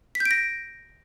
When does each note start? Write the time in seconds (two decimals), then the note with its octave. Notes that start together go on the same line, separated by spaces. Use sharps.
0.15 B6
0.20 G6
0.25 D7
0.31 A#6